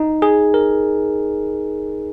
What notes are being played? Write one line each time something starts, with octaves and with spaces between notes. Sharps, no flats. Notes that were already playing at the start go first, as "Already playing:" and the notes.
Already playing: D#4
G#4
A#4